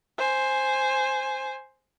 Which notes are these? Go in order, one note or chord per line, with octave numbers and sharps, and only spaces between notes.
C5 G#5